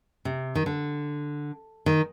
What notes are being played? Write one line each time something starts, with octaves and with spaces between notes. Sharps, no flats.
C3
D#3
D3
D#3